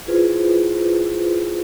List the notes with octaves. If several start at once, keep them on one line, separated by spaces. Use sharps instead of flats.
E4 F4 G#4 B4 C5